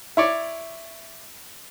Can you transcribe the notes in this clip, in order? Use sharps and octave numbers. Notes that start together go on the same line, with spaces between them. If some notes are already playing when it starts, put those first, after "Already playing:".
E4 C#5 D5